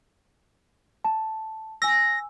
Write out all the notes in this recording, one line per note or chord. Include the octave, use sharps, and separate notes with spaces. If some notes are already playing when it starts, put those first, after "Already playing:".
A5
G#5 E6 A#6